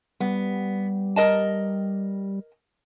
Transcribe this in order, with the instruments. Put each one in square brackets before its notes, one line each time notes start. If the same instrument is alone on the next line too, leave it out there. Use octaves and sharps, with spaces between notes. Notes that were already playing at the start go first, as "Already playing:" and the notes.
[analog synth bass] G3 [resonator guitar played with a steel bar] B3
[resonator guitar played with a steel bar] A#4 D#5 A5